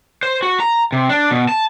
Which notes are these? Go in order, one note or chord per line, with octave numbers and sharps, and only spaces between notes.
C5
F#4
A#5
C3
D4
B2
A5